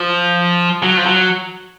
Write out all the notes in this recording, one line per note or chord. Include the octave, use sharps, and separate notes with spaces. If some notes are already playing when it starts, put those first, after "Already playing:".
Already playing: F3
F#3
F3
F#3